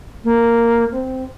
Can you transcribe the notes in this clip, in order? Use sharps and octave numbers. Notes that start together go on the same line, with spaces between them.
A#3
C4